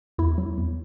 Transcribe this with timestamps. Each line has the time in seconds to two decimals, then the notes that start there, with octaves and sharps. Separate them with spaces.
0.18 E2 E4
0.38 F#3
0.58 E2